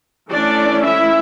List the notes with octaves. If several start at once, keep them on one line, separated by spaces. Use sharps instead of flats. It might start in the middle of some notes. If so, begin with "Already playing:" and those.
E3 A3 C#4 D4 D5
E4 E5